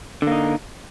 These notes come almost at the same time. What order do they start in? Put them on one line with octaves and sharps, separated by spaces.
D3 A#3 D#4